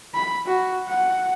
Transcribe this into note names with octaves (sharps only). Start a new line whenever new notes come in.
B5
F#4
F#5